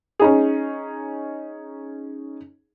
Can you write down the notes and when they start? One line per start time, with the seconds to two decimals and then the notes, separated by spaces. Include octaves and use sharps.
0.19 C#4 D#4 G#4